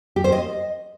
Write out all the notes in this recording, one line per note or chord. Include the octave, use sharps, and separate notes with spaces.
G4
C5
D#5